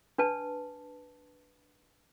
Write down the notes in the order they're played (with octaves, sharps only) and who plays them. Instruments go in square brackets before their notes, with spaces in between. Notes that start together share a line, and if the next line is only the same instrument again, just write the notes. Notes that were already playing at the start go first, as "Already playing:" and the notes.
[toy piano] D4 B4 A5